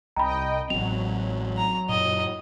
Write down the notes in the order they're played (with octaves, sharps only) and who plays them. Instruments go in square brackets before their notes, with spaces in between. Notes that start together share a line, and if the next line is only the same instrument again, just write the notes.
[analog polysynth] C2 D#5 G5 [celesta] A#5 B5
[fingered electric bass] A1 C4 [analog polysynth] F#3 [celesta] F7
[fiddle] A#5
[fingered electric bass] F#2 A#2 [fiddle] D#5